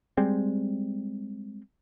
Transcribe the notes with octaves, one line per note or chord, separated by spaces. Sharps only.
G3 G#3 C4